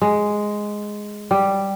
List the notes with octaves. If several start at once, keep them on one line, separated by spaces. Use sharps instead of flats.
G#3
G3